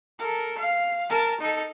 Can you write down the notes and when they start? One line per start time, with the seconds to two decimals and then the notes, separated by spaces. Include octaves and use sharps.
0.19 A4 A#4
0.58 F5
1.09 A#4 A5
1.41 D#4 A4